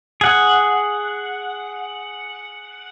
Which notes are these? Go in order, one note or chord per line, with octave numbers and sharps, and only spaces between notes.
G#4 F#5